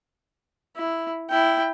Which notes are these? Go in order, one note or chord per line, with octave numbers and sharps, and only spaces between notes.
E4
E4 G5